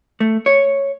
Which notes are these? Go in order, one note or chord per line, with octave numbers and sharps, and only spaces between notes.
A3
C#5